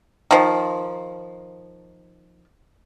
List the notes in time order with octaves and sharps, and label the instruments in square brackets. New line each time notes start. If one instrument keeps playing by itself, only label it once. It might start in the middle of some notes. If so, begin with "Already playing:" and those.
[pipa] D#3 F3